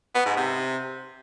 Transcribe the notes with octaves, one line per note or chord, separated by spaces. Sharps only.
B3
G#2
C3